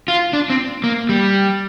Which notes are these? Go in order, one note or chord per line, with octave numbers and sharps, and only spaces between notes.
F4
D4
C4
A#3
G3